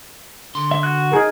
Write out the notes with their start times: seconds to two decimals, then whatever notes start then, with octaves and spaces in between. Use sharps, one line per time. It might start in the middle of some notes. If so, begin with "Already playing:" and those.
0.55 D3 C6
0.71 E5
0.83 F#4 F#6
1.12 D#4 G#4 A#4